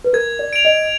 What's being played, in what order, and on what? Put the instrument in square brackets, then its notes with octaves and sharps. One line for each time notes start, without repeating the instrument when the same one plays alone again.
[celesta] B4
[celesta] A#4 [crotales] G#6
[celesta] D5
[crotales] D7 F7
[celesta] D#5